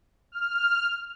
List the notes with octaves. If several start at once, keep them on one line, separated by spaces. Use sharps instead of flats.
F6